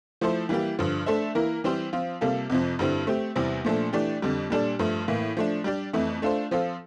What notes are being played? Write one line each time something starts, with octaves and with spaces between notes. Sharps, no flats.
F3 A3 E4 A4 C5
E3 G3 A#3 E4 G4
G2 D3 F3
A3 D4 A4 C5 E5
E3 A#3 E4 A#4
E3 G3 C4 G4 C5
F3 C4 F4
C3 G3 A#3 F4 A4
F2 C3 F3
G2 D3 G3 C4 E4
A3 C4 G4
E2 C3 G3 C4 E4
A#2 F3 A3 D4 A4
E3 A3 D4 G4 D5
F2 D3 G3
A#2 G3 D4 A4 D5
G2 F3 A3
A2 E3 A#3
F3 A3 D4
G3 D4 G4 D5
F2 E3 A3 E4
A3 D4 F4 A4 C5
F3 C4 F4 A4